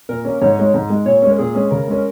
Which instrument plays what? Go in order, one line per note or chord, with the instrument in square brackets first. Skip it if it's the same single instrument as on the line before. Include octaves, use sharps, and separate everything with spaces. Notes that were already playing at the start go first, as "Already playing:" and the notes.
[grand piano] A#2 [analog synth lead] A#4
[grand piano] A#3 C#4
[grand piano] G#2 [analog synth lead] C#5
[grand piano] G#3 D#4
G#2
G#3 D#4
[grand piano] A#2 [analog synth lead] C#5
[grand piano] G#3 C#4
[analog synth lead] A#4
[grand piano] A#2 [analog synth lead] G#4
[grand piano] G#3 C#4
[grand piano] C#3 [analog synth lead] A#4
[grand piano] G#3 C#4